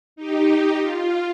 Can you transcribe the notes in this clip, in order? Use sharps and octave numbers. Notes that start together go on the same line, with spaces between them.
D#4 G4
F4